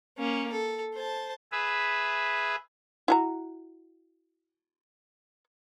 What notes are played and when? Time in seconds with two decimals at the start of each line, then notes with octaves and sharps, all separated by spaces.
0.18 A#3 C#4
0.52 A4
0.95 C5 A5
1.52 G#4 B4 E5
3.08 E4 F#4 A#5